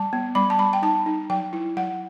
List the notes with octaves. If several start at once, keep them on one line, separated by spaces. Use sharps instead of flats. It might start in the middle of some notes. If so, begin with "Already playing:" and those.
Already playing: G3 A5
B3
G3 B5
A5
G3 B5
G5
D#4 A5
D#4
F#3 G5
E4
F#3 F#5